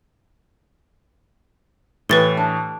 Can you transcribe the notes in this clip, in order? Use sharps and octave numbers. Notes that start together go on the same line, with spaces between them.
A2 E3 G4 B4 A6 G7
D4